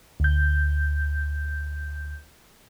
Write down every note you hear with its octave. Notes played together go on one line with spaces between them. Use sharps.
D2 G6